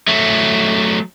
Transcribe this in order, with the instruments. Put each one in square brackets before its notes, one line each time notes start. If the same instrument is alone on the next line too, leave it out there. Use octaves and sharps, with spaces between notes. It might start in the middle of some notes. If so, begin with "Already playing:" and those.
[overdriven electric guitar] F#3 A3